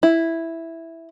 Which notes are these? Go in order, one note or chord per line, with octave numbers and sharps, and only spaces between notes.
E4